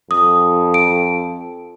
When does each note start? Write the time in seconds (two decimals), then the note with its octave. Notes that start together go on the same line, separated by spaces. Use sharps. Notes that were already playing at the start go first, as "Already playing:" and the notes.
0.11 F2 D#6
0.74 D7